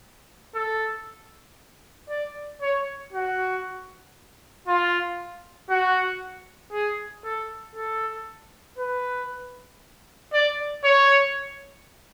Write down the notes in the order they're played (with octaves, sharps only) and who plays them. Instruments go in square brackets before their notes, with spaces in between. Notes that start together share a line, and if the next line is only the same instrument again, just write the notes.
[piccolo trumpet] A4
D5
C#5
F#4
F4
F#4
G#4
A4
A4
B4
D5
C#5